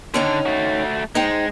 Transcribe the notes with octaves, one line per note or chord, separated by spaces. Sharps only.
D3 D#3 C#4 D#4
A3 F#4
G#3 D#4 C5 G5